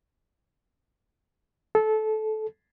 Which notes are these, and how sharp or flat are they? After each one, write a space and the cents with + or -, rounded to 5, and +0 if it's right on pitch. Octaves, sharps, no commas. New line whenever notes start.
A4 -20